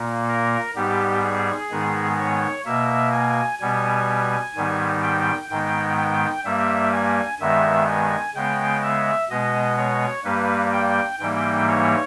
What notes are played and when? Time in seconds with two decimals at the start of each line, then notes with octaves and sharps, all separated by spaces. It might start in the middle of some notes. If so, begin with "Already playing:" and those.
Already playing: A#2 A#3
0.28 A#4
0.76 G#2 G3 B3 G4
1.23 G#4
1.71 G#2 D#3 G#3 B3
2.18 C#5
2.65 B2 A#3 E5
3.12 G#5
3.60 B2 G3 B3 G#5
4.55 G#2 D#3 G3 B3
5.02 G5
5.50 G#2 D#3 G#3 B3 G5
5.98 G5
6.44 G2 G3 A#3 E5
6.92 G#5
7.39 G2 D#3 G#3 B3 E5
7.88 G#5
8.35 C#3 G#3 B3 G5
8.82 E5
9.30 B2 G#3 B3 D#5
9.77 C#5
10.24 G2 G3 A#3 B4
10.73 G5
11.20 G#2 E3 G3 A#3 G5
11.68 C#5